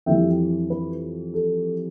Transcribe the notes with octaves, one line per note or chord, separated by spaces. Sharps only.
F2 E3 G3 E5 G5
B4
A4